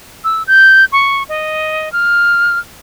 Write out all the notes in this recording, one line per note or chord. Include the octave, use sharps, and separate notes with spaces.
E6
G6
C#6
D#5
F6